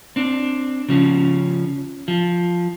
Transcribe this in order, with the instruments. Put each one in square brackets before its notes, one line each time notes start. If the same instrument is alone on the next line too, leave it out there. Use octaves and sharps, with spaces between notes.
[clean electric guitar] C4 D4
C#3 F3 C#4
F3